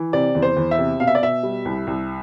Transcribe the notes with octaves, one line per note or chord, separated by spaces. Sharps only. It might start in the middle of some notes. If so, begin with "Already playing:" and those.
Already playing: E3
C3 D5
E2
C5
E2
E5
C3
B2 F5
E5
D5
B2 E5
G3
C2
C2